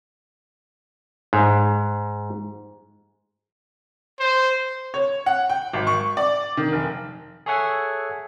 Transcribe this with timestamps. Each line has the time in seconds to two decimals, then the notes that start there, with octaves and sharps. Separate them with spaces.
1.33 G#2
4.20 C5
4.94 C#5
5.26 F#5
5.49 G5
5.73 G#1
5.87 C#6
6.17 D5
6.57 D#3
6.72 F1
7.46 G#4 A4 C#5 E5 F#5 G#5